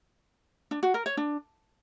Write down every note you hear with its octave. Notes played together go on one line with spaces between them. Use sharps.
D4
F#4
A#4
C#5
D4